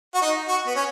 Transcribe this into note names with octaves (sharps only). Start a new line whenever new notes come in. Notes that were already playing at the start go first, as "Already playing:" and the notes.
F#4
D#4
F#4
B3
C#4